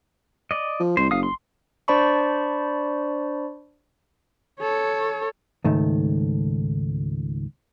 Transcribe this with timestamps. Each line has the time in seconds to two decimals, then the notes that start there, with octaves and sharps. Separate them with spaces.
0.51 D5 D#5
0.80 F3
0.97 C2 C5
1.11 F#1 F5 D#6
1.23 C6
1.88 D4 C5 D5 A5 B5 C#6
4.60 A4 C#5
5.64 C#2 G#2 D#3 A3